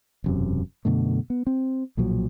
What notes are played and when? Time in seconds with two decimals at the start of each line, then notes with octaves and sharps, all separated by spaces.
0.24 E1 F#2 C3
0.85 F#2 B2 D3 A3
1.30 B3
1.47 C4
1.97 B1 A#2 F3 F#3